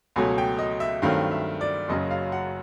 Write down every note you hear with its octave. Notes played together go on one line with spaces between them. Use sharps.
C#2 B2 F#3 A3 G#5
G5
D#5
E5
G2 D#3 F#3 A3 C4 F5
E5
D5
F#1 F#2 C#3 F#3 D#5
F5
F#5